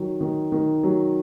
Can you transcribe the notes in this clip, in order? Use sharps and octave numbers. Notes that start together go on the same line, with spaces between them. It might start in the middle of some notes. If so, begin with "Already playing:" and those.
Already playing: D#3 F#3
D#3
D#3
F#3